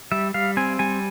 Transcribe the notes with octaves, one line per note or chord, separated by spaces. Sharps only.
G3 E5
G3 F5
C4 G#5
G3 G#5